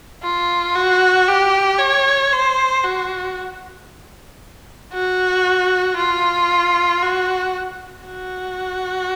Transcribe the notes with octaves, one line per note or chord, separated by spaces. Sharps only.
F4
F#4
G4
C#5
C5
F#4
F#4
F4
F#4
F#4